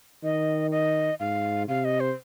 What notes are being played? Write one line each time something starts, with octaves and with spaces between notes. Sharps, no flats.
D#3 D#5
D#5
G#2 F5
C3 F5
D#5
C5